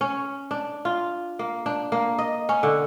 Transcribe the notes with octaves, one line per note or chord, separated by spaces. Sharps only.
C#4
D4
F4
A#3
D4
A#3
D#5
C#4
D3